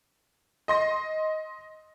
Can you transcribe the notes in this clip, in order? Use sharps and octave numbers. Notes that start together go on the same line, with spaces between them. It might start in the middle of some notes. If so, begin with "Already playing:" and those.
D#5 C6 A#6